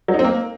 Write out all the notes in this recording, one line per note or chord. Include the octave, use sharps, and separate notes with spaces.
F#3
D#4
C4
A#3